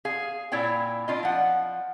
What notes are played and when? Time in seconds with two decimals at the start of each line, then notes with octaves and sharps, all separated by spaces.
0.05 G#4 F5
0.52 A#2 E4 C#5 D5 G5
1.08 D4 F4 D#5
1.23 F3 F#5